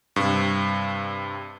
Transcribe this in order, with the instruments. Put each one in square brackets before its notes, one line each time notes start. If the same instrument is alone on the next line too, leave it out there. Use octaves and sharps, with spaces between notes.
[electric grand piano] G2 C3